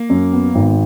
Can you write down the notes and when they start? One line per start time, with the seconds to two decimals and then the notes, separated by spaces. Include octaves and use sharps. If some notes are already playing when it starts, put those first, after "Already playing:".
Already playing: A#3
0.09 F#2
0.33 B3
0.55 G#1